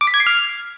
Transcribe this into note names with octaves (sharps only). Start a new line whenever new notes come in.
D6
B6
G#6
C7
F6